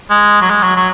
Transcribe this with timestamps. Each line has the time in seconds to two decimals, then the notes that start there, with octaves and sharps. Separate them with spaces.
0.10 G#3
0.41 F#3
0.50 G#3
0.63 F#3
0.76 F#3